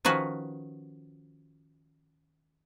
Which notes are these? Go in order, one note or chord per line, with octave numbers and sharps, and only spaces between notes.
D#3 F3 C#4 F#4 B4